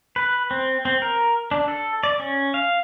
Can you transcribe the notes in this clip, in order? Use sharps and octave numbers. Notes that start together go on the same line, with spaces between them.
B4
C4
C4
A#4
D4
A4
D5
C#4
F5